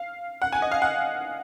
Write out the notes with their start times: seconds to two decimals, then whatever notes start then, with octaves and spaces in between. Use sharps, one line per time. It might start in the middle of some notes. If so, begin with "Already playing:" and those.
Already playing: F5
0.42 F#5
0.53 G#5
0.62 D#5
0.72 F5
0.82 F#5